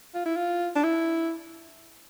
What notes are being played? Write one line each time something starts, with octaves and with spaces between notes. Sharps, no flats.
F4
E4
F4
D4
E4